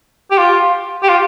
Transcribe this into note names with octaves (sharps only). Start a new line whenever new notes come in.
G4
F4
G4
F4